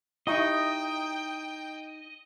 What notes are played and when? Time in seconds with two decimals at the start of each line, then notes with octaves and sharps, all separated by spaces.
0.27 D#4 E4 G4 D#5 G5 C#6